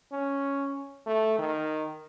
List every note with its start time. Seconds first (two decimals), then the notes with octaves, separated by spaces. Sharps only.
0.12 C#4
1.07 A3
1.39 D#3